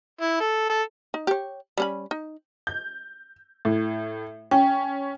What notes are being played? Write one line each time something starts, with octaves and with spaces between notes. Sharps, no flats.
E4
A4
A4
D#4
G4 C#5
G3 C#4 B5
D#4
G6
A2
C#4 G5